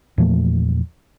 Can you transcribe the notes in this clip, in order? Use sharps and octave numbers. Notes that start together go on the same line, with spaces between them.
E2 A#2 F3 A3